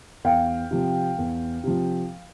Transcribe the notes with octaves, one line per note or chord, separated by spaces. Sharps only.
E2 F5 G5
C3 F3
E2
C3 F3